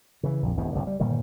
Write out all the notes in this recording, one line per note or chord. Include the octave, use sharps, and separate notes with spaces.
C#3 E3
A#1 F2
G#1 E2 G2 B2
F#1 C2 G2 A#2
G3
G1 A#2 D#3 G3